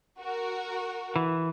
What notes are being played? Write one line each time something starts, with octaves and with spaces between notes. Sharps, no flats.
F#4 A#4
E3